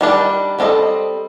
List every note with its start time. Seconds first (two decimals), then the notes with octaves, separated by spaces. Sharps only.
0.01 D#3 G3 D4
0.59 G3 C4 F4 A4 D#5